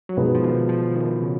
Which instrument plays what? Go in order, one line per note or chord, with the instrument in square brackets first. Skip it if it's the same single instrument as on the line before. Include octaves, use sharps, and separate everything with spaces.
[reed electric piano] F#3
[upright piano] B2 G#3 B3 D#4 G#4 [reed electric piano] F3
[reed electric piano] F3
D#3
F3
D#3
C#3